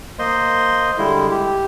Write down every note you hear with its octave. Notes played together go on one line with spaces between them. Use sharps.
A#3 C5 D#5 C6
D3 G3 G#3 E4
G4